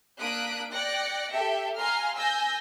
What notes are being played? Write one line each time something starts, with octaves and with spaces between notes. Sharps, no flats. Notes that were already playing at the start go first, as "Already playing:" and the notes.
A#3 D4 D#6 F#6 B6 D7
D5 G5 F#6 A#6 C#7
G4 A4 E5 G5
F5 G#5 A#5 C6 F6
G#5 E6 G6 A#6